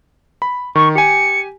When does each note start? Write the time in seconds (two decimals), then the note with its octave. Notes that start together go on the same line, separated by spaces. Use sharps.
0.42 B5
0.75 D#3 C#6
0.95 G4 G#5 C#7